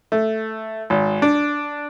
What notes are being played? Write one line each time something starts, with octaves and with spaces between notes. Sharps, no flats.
A3
G#1
D4